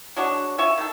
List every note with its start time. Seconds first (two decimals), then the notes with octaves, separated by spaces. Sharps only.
0.16 F#3 G#3 D4 F#4
0.58 F4 E5 G#5 C#6
0.77 D#3 A4